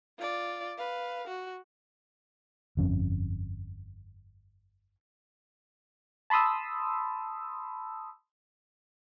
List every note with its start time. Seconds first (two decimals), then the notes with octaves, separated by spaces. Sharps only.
0.18 F4 D5
0.77 B4 F5
1.27 F#4
2.77 G1 F2 C#4
6.30 A5 B5 C6 D#6 E6